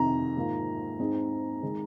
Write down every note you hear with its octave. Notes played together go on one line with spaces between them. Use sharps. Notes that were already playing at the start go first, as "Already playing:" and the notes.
Already playing: F2 C3 D#3 A#5
G#2 D#3 A#3 F4
G#2 G#3 C4 D#4
D#3 G#3